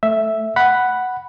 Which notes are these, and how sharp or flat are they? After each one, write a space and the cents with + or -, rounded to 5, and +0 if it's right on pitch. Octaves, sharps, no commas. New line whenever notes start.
A3 +0 E5 +0
F#5 +5 B5 +0